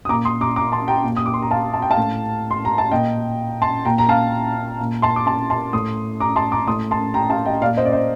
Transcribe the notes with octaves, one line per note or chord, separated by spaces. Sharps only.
D#6
A#2 A#5 D6
C6 D#6
A#5 D6
A#5 D6
A5 C6
G5 A#5
A#2
D#6
D6
C6
A#5
F5 A5
A5
G5
F5 A5
A2
C6
A#5
A5
A#2 D#5 G5
A5 C6
A#2 G5 A#5
A#5
F5 A5
A#2
A5 C6
D6
A5 C6
A5 C6
A2 C6 D#6
A#5 D6
A5 C6
A#5 D6
A2 C6 D#6
A5 C6
G5 A#5
F5 A5
D#5 G5
A#2 D5 F5
C5 D#5
D5
C5 D#5